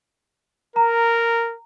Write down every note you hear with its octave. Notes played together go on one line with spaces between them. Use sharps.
A#4 A#5